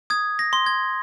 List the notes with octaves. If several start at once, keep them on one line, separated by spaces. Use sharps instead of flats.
D#6 G#6
A#6
C6
G#6